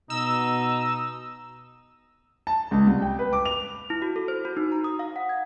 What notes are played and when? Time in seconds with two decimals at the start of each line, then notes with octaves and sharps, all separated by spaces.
0.10 B2 D#4 E6
2.47 A5
2.71 C#2
2.87 C2
3.02 G5
3.19 B4
3.33 D6
3.45 F7
3.90 E4
4.02 F#4
4.16 A4
4.28 C5
4.45 F#4
4.57 D#4
4.72 A#5
4.84 D#6
4.99 F5
5.16 F#5
5.29 G#6